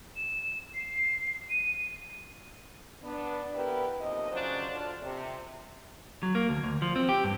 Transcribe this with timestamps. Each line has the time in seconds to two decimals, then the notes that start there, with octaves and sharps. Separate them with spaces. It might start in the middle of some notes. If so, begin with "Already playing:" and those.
0.16 E7
0.74 C7
1.50 D#7
3.03 B3 D4
3.55 B3 E4 G4 A#4 B4
3.99 D#2 C3 F3 D#5
4.31 C#3 F#3 C#4 D4 F4 C5
4.71 D3 D4 F4
5.02 C3
6.23 F#3
6.35 A#3
6.49 D2
6.63 D2
6.82 F3
6.96 C4
7.09 G4
7.24 G2